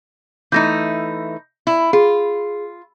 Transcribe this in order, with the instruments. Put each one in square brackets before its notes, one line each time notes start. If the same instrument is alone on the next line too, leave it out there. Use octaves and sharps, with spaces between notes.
[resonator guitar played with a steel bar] E3 A3 D#4 [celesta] G6 A#6
[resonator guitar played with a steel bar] E4
[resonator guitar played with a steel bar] F4 [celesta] G#4